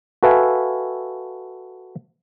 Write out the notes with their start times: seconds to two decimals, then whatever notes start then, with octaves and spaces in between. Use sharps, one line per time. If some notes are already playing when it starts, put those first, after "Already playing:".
0.23 F#4 A4 B4 E5 F5 G#5